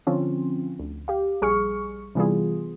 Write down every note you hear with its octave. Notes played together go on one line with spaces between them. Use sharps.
D3 F3 C4 C#4 F4
D2
G4 F5
A#1 G3 G#4 C#6 F6 C#7
C3 E3 G3 B3 F4 G#4